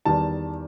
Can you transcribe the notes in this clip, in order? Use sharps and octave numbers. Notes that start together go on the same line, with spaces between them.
E2 D#3 G3 A5